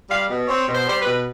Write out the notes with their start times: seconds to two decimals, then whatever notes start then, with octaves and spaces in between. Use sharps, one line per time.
0.09 G3 F5
0.30 B2
0.48 C4 C#5
0.67 B2
0.74 C5
0.87 G3 C5
1.00 B4
1.06 B2